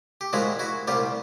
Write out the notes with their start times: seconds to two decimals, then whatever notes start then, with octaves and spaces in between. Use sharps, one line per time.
0.21 G4
0.33 A#2 F3 G#3 E4 F#4
0.59 E4 F#4
0.87 C2 A#2 G3 F4 G4